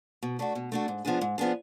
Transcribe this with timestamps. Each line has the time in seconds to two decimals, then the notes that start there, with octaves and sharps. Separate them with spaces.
0.23 B2
0.39 A3 D4 F#4
0.55 B2
0.72 A3 D4 F#4
0.88 G#2
1.05 F3 B3 D4 G#4
1.21 G#2
1.38 F3 B3 D4 G#4